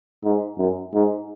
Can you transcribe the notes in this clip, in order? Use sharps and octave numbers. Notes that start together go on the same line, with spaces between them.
G#2
F#2
G#2